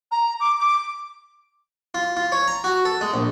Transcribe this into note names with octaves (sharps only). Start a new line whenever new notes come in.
A#5
D6
D6
F4
F4
C#5
A#5
F#4
A4
G#3
A#1